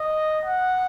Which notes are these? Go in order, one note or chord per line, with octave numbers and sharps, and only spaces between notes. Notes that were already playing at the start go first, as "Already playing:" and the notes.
Already playing: D#5
F#5